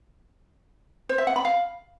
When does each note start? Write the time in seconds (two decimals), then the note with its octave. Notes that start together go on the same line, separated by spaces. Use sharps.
1.09 C5
1.18 E5
1.27 F#5
1.36 B5
1.45 F5